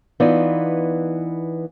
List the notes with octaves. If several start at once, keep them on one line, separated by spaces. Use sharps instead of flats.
E3 B3 D#4 F4 D5